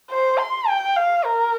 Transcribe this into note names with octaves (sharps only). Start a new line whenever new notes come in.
C5
C6
G5
F5
A#4